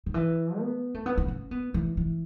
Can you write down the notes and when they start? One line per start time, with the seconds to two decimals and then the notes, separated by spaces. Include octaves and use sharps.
0.06 D#3
0.14 E3
0.59 B3
0.94 A3
1.06 B3
1.18 B3
1.28 C#4
1.51 B3
1.74 E3
1.97 E3